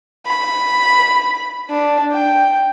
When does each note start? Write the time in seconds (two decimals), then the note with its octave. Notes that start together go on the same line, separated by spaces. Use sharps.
0.26 B5
1.70 D4
2.13 G5